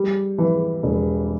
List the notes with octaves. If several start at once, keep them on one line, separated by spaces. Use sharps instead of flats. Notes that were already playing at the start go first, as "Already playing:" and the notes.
Already playing: G3
E3
E1